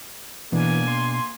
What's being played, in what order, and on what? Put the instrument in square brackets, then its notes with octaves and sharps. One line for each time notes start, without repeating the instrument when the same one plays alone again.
[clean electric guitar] B2 D4 [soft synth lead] E3 [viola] A#3 G#5
[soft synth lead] C6